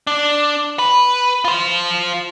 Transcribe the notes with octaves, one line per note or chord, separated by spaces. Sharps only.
D4
B4
F4 C5